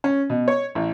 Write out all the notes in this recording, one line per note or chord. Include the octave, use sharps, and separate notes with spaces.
C#4
B2
C#5
A1